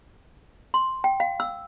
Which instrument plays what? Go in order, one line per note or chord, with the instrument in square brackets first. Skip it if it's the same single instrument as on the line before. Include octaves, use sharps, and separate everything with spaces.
[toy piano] C6
G5
F5
E6